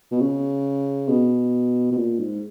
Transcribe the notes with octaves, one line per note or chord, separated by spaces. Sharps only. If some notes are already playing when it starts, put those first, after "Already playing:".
B2
C#3
B2
B2
A#2
G#2